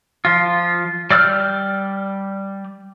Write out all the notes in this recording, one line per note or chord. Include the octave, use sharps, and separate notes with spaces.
F3 F4
G3 D5 E6 F6 G6